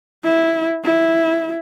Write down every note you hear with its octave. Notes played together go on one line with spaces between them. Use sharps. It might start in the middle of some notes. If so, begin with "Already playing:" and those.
E4
E4